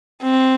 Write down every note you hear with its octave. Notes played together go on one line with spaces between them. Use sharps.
C4